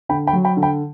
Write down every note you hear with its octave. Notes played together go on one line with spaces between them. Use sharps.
D3 G5 B5
G5 B5
F#3
G5 B5
D3
G5 B5